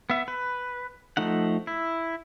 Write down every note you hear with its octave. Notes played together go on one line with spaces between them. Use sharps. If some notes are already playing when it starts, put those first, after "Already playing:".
B3 E5
B4
F3 A3 D#4 F#5
E4